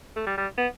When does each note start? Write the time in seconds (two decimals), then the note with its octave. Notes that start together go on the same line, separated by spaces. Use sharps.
0.16 A3
0.26 G3
0.37 G3
0.57 B3